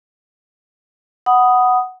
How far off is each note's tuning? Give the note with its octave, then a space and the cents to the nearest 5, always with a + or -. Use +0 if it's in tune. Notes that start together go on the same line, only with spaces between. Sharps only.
F#5 +5 B5 +0 D#6 +0